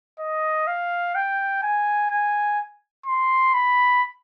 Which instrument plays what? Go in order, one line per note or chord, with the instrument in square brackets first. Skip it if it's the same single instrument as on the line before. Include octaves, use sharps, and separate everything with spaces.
[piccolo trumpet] D#5
F5
G5
G#5
G#5
C6
B5